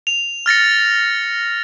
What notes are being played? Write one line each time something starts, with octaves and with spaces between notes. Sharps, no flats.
F7
F6 A6 A#6 C#7